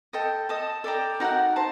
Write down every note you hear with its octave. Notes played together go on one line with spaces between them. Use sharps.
A4 D#5 G5
A4 D#5 A5 D#6
A4 D5 G5 A#5
D#4 F#4 A#4 F#5
C5 A5